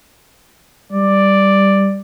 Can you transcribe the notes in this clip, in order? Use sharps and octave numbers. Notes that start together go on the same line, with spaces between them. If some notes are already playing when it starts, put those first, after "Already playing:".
G3 D5